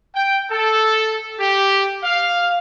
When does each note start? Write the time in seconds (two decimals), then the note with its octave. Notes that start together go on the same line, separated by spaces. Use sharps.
0.15 G5
0.50 A4
1.39 G4
2.04 F5